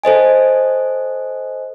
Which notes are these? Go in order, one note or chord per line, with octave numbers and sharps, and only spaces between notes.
A4 C5 D#5 G#5